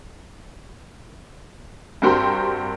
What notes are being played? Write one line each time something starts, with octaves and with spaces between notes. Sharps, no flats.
G2 C4 F#4 G4 A#4 C6